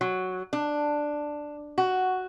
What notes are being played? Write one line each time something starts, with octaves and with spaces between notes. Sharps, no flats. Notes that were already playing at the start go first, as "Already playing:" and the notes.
F#3
D4
F#4